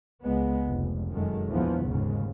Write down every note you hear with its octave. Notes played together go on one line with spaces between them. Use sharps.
C#2 G#3 B3
F1
F#2 D#3 G#3 A3
A#1 E2 E3 F3 B3
F1 D#2 G#2 C#3